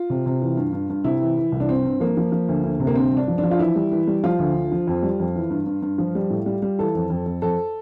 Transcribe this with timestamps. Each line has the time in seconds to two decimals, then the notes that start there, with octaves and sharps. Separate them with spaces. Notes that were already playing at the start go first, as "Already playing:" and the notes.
Already playing: F4
0.10 C3
0.26 C3
0.42 E3
0.57 G2
0.73 G2
0.90 G2
1.04 C3 E4
1.21 E3
1.37 E3
1.52 C2
1.60 D4
1.69 G2 C4
1.85 G2
2.00 F3 A#3
2.17 F3
2.32 F3
2.49 D2
2.64 D2
2.80 C3
2.87 A#3
2.96 G2 C4
3.12 G2 D4
3.28 F3
3.38 D4
3.43 F3
3.51 F4
3.59 E3 E4
3.76 G3
3.91 E3
4.07 G3
4.24 F3 F4
4.39 D2
4.55 D3
4.71 F3
4.88 F2
5.03 G3
5.19 F2
5.36 E3
5.50 G2
5.66 G2
5.82 G2
5.98 F3
6.15 G3
6.30 A2
6.46 G3
6.62 G3
6.79 E3 A4
6.95 F2
7.10 F2
7.26 F2
7.42 F2 A4